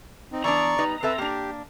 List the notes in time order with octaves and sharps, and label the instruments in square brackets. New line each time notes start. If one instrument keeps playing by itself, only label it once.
[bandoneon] C4 D#4
[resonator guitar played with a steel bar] E3 B3 D4 [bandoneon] D5 C#6 [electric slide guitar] A#5
[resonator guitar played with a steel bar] G3 D#4 B4
[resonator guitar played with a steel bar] C4 A4 E5 [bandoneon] B4
[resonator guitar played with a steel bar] A#3 D4 [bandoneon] G4